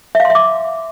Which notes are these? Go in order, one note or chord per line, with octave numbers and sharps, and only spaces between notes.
E5
F5
C6
E5
D6